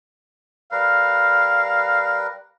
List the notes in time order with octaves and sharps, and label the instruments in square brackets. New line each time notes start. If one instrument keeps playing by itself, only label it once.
[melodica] G3 A#4 B4 [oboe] F5